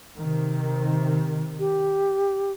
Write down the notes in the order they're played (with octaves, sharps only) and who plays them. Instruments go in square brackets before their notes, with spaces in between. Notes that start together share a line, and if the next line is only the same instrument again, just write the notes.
[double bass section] C3 D#3
[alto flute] G4